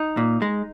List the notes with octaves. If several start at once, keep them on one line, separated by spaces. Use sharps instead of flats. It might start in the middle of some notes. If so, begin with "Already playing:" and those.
Already playing: D#4
A#2
G#3